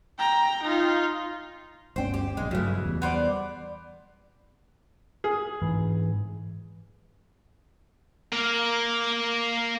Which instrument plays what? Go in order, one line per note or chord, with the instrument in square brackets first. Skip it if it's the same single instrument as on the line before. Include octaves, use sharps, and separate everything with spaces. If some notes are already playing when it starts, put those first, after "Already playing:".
[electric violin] G5 A#5
D#4 F4
[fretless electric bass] G1 D2 C#4 [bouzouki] C5 G5
[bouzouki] G4
[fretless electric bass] D1 A#1 [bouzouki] G#3
[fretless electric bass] G2 F#3 A3 [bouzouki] C#3 E3
[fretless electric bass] E2 G3
[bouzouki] B3 C5 D5
[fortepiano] G#4
[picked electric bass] G#2 E3
[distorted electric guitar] A#3 F5